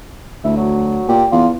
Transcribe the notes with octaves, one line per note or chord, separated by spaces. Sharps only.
D2 E4
F#3
A#2 G4
E2 F4